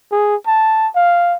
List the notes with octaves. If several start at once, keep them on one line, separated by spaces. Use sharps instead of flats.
G#4
A5
F5